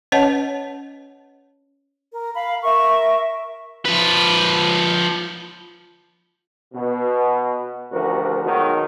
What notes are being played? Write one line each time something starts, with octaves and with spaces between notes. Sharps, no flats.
C#4 B4 C#5 D#5 F#5 A5
A#4
F5 B5
A#4 E5 C#6
F3 B4
B2
A1 D2 F3 F#4 G4 A#4
B2 D#3 F#3 G#3 F#4